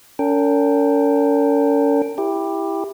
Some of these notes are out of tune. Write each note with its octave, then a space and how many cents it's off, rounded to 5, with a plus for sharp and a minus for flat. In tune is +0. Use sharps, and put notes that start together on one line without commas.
C#4 +40 A#4 -40 G5 +0
E4 +0 G4 +15